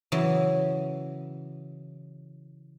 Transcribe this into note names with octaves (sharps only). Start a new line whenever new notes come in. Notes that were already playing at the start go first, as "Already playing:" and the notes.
C#3 E3 F#3